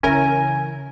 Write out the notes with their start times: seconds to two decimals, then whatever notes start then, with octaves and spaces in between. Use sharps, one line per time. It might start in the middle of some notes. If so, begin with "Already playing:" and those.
0.03 C#3 E3 C#4 E4 A#4 G#5